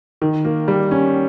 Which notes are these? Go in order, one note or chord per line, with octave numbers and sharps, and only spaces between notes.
D#3
A#3
G3
C#4